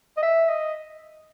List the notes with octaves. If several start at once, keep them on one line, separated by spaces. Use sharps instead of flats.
D#5
E5
D#5